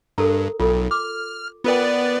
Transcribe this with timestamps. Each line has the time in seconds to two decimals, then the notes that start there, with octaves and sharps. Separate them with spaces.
0.18 G2 A4 A#4 A#5
0.60 B1 F4 A4
0.91 D6 F6
1.64 B3 F4 A#4 B4 D5 G5